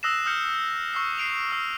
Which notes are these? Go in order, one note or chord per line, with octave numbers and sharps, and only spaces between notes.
D#6 E6 F#6 A#6 C7 E7
D#6 F6 G6 C#7
C#6 E6 C7
C7 D7 F7
E6 C7 E7